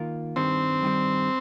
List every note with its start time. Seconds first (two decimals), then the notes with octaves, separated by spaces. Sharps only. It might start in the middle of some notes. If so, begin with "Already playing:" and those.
Already playing: D#3 A#3 F4 A#4
0.36 G2 D#3 G3 C4
0.83 G2 D#3 G3